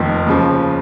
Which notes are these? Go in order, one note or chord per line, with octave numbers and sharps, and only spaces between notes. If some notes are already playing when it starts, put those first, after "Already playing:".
Already playing: F1 F2 D#3 A#3
D#2 C#3 F3